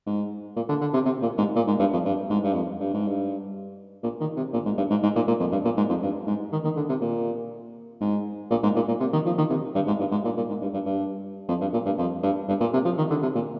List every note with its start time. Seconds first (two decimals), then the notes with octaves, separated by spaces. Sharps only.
0.06 G#2
0.56 A#2
0.69 D3
0.81 D3
0.94 C3
1.05 C3
1.22 A#2
1.38 G#2
1.56 A#2
1.67 G#2
1.79 G2
1.93 F2
2.05 G2
2.30 G#2
2.44 G2
2.54 F2
2.80 G2
2.94 G#2
3.08 G2
4.03 A#2
4.21 D#3
4.36 C3
4.53 A#2
4.66 G#2
4.77 G2
4.90 G#2
5.03 G#2
5.16 A#2
5.28 A#2
5.40 F2
5.52 G2
5.64 A#2
5.77 G#2
5.89 F2
6.02 G2
6.26 G#2
6.52 D#3
6.64 D#3
6.76 D3
6.89 C3
7.01 A#2
8.01 G#2
8.51 A#2
8.63 G#2
8.76 A#2
8.88 A#2
9.00 C3
9.13 D#3
9.25 F3
9.38 D#3
9.50 C3
9.75 G2
9.87 G#2
9.99 G2
10.11 G#2
10.24 A#2
10.37 A#2
10.49 G#2
10.61 G2
10.73 G2
10.86 G2
11.48 F2
11.61 G2
11.73 A#2
11.85 G2
11.98 F2
12.23 G2
12.48 G2
12.60 A#2
12.73 C3
12.85 F3
12.97 D#3
13.10 D3
13.22 C3
13.35 A#2